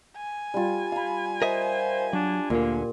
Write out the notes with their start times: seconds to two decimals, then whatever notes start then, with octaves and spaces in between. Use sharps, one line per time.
0.17 G#5
0.54 G3 F4
0.92 F5 B5
1.42 A#4 C5 D#5 E5
2.13 F#3 D4
2.50 D2 A#2 D3 A#3